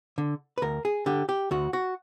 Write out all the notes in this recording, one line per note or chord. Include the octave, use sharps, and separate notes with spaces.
D3
B4
D2 A#4
G#4
D3 G4
G4
D2 F#4
F#4